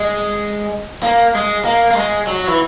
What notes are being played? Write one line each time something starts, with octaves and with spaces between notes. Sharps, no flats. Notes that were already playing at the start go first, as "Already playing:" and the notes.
Already playing: G#3
A#3
G#3
A#3
A#3
G#3
F#3
E3